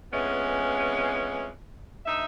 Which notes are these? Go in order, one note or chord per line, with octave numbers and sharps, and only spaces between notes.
F2 E3 G#3 B3 C#4
D2 D#4 E5